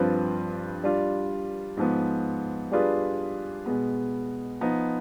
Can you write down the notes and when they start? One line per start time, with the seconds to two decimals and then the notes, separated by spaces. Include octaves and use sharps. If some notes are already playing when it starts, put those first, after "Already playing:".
Already playing: G2 F3 C4 F4 B4
0.84 G3 D4 F4
1.77 G#2 F3 B3
2.72 G3 D4 F4 G#4 B4
3.66 B2 G#3 B3
4.61 F3 B3 D#4